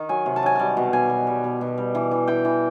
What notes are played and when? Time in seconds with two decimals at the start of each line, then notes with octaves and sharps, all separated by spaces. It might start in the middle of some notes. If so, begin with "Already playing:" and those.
Already playing: D#3
0.09 F#3 G#5
0.26 C3
0.36 A5
0.43 F#3 G#5
0.56 G3 A5
0.77 B2
0.93 B2 G#5
1.10 B2
1.27 G3
1.44 B2
1.61 B2
1.78 G3
1.95 E3
2.11 E3
2.28 E3 G5
2.45 E3